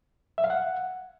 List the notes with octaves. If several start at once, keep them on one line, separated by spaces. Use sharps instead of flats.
E5
F5
F#5